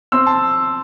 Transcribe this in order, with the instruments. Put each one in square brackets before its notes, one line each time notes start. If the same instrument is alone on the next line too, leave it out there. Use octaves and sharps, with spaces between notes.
[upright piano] C4 C6 E6
A5 C6